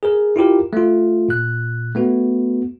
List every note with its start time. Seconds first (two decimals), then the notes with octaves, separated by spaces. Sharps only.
0.03 G#4 A#4
0.36 E4 F4 G4 A#4
0.73 A3 F4
1.29 A#2 F#6
1.95 A3 B3 F#4